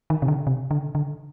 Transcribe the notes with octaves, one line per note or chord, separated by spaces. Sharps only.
D#3
C3
D3
C3
D3
D3